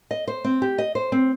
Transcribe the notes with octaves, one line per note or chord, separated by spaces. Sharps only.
D#5
C5
C4
G4
D#5
C5
C4